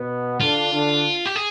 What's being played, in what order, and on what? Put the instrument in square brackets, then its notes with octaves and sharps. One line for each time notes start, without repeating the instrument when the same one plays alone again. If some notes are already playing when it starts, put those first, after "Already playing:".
Already playing: [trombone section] B2 B3
[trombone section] D3 D4 [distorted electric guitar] F4
[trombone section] D3 D4
[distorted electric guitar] G4
G#4